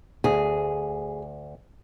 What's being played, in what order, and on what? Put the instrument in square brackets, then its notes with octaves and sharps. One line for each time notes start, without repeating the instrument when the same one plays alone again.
[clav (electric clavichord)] D2 [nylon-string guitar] G#4